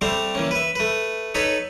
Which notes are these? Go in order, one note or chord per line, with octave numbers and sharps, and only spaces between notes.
G3 A3 C4 C5 F5
E3 A#3 C#4
B4 E5
A3 B4
D#4 A4 B4 C#5 B5